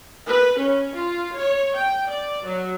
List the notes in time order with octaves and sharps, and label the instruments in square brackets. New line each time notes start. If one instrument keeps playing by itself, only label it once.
[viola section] B4
C#4
F4
C#5
G5
D5
F#3